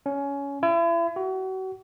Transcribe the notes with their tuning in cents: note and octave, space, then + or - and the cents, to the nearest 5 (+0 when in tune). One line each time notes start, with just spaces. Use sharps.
C#4 +20
E4 +40
F#4 +35